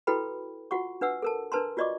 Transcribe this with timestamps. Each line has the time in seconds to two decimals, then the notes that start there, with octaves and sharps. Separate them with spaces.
0.07 E4 F#4 A4 B4 G5 B5
0.71 F4 F#4 F#5 C#6
1.01 D4 B4 F#5 E6
1.22 A4 A#4 A5
1.52 D4 A#4 B4 A5 A#5 C6
1.77 F4 F#4 D5 D#5 C#6 D6